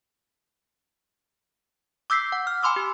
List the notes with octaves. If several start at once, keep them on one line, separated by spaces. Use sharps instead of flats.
D6 E6 G6 B6 C7
F#5
F6
G#5 B5 C6 D6 E6
G4